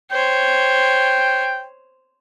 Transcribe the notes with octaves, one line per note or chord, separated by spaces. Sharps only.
C5 C#5 G5